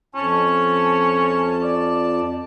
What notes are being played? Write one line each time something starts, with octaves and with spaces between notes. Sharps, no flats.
F2 C#4 A5
D5